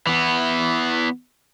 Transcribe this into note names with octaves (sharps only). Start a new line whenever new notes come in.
E3 B3